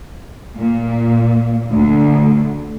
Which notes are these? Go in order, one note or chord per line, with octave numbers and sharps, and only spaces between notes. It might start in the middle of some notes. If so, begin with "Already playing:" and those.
A#2
D2